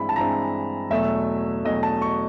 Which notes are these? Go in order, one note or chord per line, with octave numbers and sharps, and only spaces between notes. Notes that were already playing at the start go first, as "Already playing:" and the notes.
Already playing: G2 E3 G#3 C4 E4 B5
A5
G2 E3 G#3 C4 E4 A#5
E2 B2 F#3 A3 E5
E2 B2 F#3 A3 D#5
A5
C#6